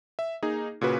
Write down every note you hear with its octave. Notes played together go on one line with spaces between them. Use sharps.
E5
A#3 D#4 G#4
A#2 C#3 F#4 B4